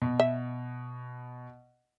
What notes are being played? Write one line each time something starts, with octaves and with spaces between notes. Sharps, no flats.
B2
E5